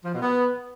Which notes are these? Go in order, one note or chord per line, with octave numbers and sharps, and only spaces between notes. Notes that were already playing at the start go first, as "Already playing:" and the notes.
F3
B2
B3